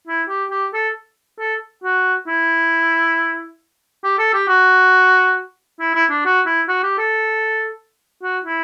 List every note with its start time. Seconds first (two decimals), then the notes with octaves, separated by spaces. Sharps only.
0.07 E4
0.29 G4
0.51 G4
0.74 A4
1.39 A4
1.83 F#4
2.27 E4
4.04 G4
4.19 A4
4.34 G4
4.48 F#4
5.80 E4
5.95 E4
6.10 D4
6.25 F#4
6.46 E4
6.69 F#4
6.83 G4
6.98 A4
8.22 F#4
8.44 E4